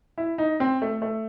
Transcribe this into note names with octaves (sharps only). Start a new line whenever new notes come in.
E4
D#4
C4
A3
A3